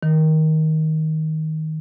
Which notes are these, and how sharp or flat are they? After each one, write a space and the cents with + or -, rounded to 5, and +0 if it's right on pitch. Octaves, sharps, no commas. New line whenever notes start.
D#3 +15